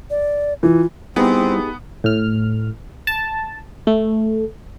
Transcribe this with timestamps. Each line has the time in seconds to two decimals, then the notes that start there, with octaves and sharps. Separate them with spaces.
0.10 D5
0.63 E3 F4
1.16 G3 B3 C4 D#4 E4 G4 G#4
2.04 A2 F6
3.07 A5
3.87 A3